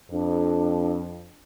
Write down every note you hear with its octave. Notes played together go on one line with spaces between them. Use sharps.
F2 D4